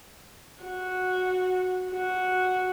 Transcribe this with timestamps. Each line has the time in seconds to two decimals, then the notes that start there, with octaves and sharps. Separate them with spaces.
0.63 F#4
1.93 F#4